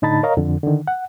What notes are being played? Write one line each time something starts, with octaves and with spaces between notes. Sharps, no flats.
A2 D3 D#4 A5 B5 A6
A#4 C#5 D#5 F5 A#5
F2 D3
D3 D#3
F#5